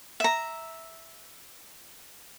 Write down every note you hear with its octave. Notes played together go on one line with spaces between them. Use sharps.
E5 A#5